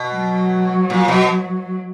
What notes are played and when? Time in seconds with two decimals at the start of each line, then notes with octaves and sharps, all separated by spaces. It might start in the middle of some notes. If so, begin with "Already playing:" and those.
Already playing: B2
0.14 F#3
0.90 A#2
1.08 B2